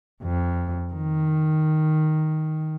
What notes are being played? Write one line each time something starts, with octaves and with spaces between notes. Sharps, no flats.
F2
D#3